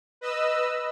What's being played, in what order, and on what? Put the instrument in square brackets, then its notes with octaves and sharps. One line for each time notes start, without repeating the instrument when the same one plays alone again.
[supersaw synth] B4 D#5 E6